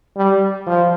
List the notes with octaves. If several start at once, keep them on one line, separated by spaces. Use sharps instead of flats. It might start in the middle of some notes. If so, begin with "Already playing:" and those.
G3
F3